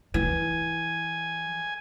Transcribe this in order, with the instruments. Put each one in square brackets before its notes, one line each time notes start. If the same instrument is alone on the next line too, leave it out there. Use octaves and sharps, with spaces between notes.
[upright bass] E3 [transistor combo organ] G#5